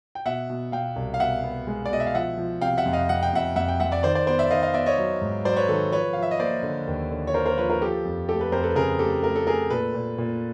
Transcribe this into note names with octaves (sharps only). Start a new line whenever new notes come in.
G5
B2 E5 F#5
B2
B2 F5 G5
C2
F5
B2 E5 F#5
B3
G#3
D5
B2 D#5
E5
F5
F3 E5 F#5
F3
C3 F5 G5
E5 F#5
F2
D#5 F5
F2 F#5
G5
F2 E5 F#5
F2 E5 F#5
G5
F2 E5 F#5
D5 E5
D#3 C5 D5
C5 D5
B3 C5 D5
D5 E5
D#3 D#5 F5
D#5 F5
B3 D5 E5
C#5 D#5
F#3
G#2
F#3 C5 D5
B4 C#5
D#3 A4 B4
F3 B4 C#5
F3 F5
E5
D#5
A#3 C5 D5
D3
D#2
D3
C#5
A#3 A#4 C5
A#4 C5
F3 B4 C#5
A#4 C5
F3 G4 A4
F2
A3 G4 A4
A4 B4
F2 A#4 C5
A4 B4
C#3 G#4 A#4
A3 G4 A4
A3 A#4
A4
A3 G#4 A#4
A#2 A4 B4
A#2
A#2